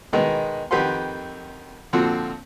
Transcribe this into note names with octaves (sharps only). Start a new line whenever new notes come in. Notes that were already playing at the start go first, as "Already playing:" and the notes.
B2 D#3 G#3 B3
F2 D#3 G4 B4 F#5 C6
A#2 D3 F3 C4 F#4